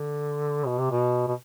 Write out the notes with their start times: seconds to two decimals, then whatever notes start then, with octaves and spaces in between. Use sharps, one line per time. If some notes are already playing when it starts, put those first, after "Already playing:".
Already playing: D3
0.66 B2
0.79 C3
0.91 B2
1.28 B2